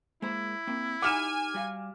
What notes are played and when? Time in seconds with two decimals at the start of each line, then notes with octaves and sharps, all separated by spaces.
0.22 G#3 A#3 E4 C5
0.67 A#3 C4
1.02 D#4 G4 F#5 G#5 D6 F6 E7
1.54 G3 F#4 F5